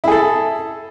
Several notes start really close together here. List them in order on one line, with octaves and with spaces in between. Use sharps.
E4 G#4 A4